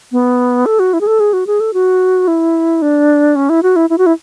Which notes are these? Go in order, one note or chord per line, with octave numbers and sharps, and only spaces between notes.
B3
A4
F#4
E4
G#4
A4
G#4
F#4
G#4
A4
F#4
E4
D4
C#4
E4
F#4
E4
E4
F#4
E4